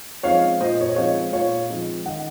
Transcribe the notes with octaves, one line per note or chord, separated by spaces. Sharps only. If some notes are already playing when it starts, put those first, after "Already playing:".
F3 G#3 C4 D#4 C#5 F5
A#2 C5 D#5
C#5
D#5
F3 G#3 C4 D#4 C#5 F5
A#2 C#5 F5
F3 G#3 C4 D#4
D#3 D#5 F#5